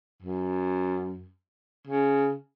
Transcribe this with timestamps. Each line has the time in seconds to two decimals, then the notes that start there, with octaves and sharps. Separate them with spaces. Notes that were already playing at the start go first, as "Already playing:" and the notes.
0.22 F#2
1.87 C#3